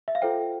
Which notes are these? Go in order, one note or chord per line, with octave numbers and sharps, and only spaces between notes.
E5
F5
F4 A4 C5 G5